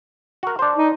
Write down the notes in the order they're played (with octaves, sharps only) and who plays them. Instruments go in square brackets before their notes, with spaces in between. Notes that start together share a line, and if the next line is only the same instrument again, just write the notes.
[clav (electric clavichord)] F#4 A#4
D4 C5
[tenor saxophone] D#4